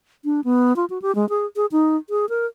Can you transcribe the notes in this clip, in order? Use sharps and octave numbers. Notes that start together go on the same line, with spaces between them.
D4
B3
F4
F#4
G4
G#3
G#4
G#4
D#4
G#4
A#4